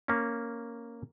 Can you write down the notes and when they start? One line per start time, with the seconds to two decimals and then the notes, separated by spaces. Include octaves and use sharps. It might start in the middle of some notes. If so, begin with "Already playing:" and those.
0.08 A#3 C#4